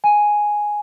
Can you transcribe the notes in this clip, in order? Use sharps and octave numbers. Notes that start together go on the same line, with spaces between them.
G#5